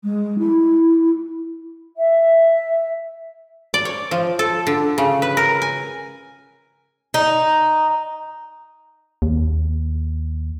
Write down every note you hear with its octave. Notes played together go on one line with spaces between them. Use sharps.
G#3
E4
E5
D5
C#5
F3
A4
D3
C#3
B4
A#4
G#5
D#4
D#2